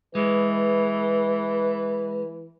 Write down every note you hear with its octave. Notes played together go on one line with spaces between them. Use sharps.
E3 G#3 B4